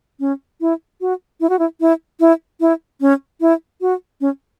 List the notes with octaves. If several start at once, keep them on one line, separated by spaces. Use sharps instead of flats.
C#4
E4
F#4
E4
F#4
E4
E4
E4
E4
C#4
E4
F#4
C#4